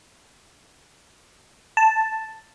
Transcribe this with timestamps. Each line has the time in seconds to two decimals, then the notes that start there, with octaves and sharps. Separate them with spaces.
1.77 A5